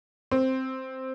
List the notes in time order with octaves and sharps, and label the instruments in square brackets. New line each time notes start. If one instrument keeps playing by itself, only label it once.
[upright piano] C4